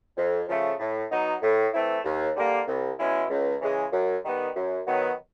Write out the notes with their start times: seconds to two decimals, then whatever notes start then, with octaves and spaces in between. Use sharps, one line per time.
0.16 F2
0.48 C#3 F3 A3
0.79 A2
1.11 F#3 B3 D#4
1.42 A2
1.73 E3 A3 C4 E4
2.04 D#2
2.36 D3 G3 A#3
2.67 C2
2.98 B2 G#3 C#4 E4
3.30 C#2
3.61 C#3 E3 G#3
3.92 F#2
4.24 D#3 G3 B3
4.55 F#2
4.86 D#3 F#3 B3